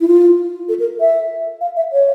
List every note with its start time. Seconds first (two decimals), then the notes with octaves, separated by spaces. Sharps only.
0.01 E4
0.08 F4
0.69 A4
0.80 A#4
1.00 E5
1.61 F5
1.76 E5
1.92 C#5